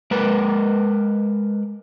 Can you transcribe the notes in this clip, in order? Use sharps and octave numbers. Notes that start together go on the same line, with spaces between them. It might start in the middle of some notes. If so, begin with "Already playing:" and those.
G#3 A#4 B4